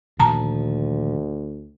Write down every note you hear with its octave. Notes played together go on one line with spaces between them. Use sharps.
D2 A#2 D#3 F3 A5 A#5